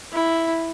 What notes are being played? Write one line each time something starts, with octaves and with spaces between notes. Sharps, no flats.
E4